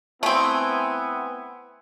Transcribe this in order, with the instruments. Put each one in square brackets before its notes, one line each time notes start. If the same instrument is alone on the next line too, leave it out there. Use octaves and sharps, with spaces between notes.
[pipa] A3 C4 [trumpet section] B3 E4 G#5